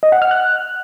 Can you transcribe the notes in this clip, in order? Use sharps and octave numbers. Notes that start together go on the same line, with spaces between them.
D#5
F#5
F6
F#6